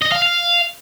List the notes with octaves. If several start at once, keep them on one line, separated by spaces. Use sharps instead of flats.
D#5
F5
F5